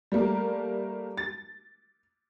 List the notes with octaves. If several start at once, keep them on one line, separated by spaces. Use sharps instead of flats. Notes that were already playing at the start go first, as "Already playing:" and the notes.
G3 A3 A#3 A#4
A6